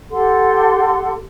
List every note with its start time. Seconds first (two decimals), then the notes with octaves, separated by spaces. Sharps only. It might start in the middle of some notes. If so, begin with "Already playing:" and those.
0.11 G4 A4 F#5 C6